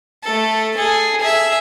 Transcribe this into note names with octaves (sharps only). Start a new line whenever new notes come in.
A3 A4
G#4 A4
G#4 E5